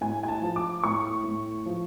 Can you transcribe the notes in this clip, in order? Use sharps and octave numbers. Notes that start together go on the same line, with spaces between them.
A2 G#5
G#5
A5
F3
D6
A2 C#6
A2
F3